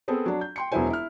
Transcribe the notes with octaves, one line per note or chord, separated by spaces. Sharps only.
B3 C4 G#4 A4 C5
F#3 D4
G6
G5 C6 C#7
E1 F#3 B3 E4 C5 G#5
E4 F6